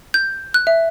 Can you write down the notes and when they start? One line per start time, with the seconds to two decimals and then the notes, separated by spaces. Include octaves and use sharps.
0.14 G6
0.54 F#6
0.67 E5